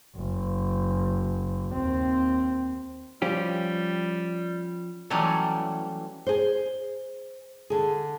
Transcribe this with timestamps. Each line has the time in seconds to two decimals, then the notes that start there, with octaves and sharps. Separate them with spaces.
0.16 F#1
1.73 D#2 C4
3.22 F3 G3 C#4 G4
5.10 E3 F#3 G3 A3 C#4
6.27 G#4 C5
7.70 D3 G#4